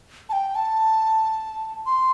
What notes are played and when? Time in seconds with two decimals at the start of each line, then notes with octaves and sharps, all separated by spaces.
0.29 A5
0.33 G5
0.55 A5
1.86 C6